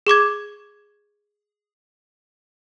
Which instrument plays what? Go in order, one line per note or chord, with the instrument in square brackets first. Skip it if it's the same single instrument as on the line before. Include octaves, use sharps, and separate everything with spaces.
[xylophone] G#4 C#6 D6 G#6